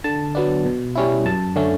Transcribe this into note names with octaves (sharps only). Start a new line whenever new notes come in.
D3 A5
F#3 B3 D4
B2
G3 C#4 E4
F#2 A5
D3 A3 C#4